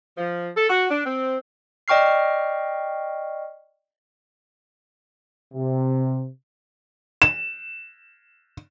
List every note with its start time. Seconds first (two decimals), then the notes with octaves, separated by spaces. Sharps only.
0.18 F3
0.56 A4
0.70 F#4
0.90 D4
1.06 C4
1.88 D5 D#5 G5 C#6 F6 C7
5.54 C3
7.22 E7